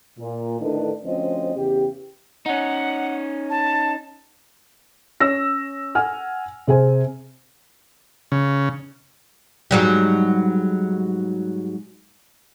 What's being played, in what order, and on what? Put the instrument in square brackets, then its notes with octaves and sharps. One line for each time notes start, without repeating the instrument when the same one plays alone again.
[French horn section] A#2
A2 D3 D#3 D4 B4
D2 F3 C4 C#4 D#5
E2 C#3 G4
[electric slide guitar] C#4 D#4 [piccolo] F#5
[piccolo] A5
[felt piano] C#4 C#5 E6 A#6
F#5 G#5 F6
C3 G#4 C5 G#5
[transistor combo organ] C#3
[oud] G#2 F#3 G3